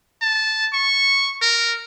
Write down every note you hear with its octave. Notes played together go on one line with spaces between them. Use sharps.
A5
C#6
A#4